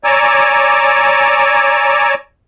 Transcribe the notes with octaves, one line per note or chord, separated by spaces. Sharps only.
C#5 D5 G#5 A#5 D6 E6